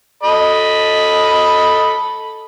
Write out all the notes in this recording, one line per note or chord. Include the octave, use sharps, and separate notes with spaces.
A4 D#5 B5